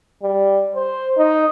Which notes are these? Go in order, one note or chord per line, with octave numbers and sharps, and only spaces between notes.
G3
C5
D#4